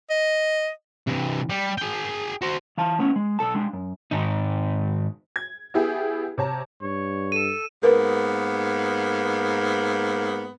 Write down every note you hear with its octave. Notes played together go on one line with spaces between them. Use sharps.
D#5
C3 E3
G3
G#4 G5
F#4 C5
E3 F5 A5
A3 B3 C#4
G#3
B1 A4 A5
G#3 D4
F#2
G#2 D#3 D#4
G#6
B3 E4 G4 G#4
C3 C#5 A5 A#5
G2 C#5
A4 D#7 E7
G#2 A#3 B3 A#4 B4